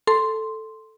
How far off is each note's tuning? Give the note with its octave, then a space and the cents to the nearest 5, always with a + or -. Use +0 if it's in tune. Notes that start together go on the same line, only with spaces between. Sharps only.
A4 +0 C6 +0